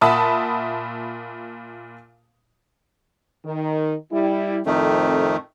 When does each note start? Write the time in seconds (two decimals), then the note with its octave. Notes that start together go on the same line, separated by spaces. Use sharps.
0.01 A#2 E5 F#5 A5 B5 D#6
3.45 D#3
4.12 G3 E4
4.66 F2 A2 D#3 A3 C4